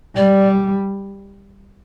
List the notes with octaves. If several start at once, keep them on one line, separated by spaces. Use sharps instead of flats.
G3 D5